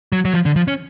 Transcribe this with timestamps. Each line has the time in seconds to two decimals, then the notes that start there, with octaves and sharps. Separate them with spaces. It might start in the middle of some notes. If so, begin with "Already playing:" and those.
0.12 F#3
0.25 F#3
0.34 F3
0.46 D3
0.56 F3
0.68 C#4